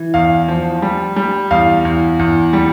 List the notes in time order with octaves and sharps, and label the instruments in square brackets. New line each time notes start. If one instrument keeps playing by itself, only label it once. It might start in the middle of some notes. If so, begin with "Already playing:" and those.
Already playing: [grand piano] E3
E2 F5
F3
G3
G3
E2 F5
E2
E2
G3